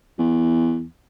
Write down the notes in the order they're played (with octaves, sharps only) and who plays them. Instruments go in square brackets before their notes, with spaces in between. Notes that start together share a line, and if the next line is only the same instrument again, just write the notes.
[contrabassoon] E2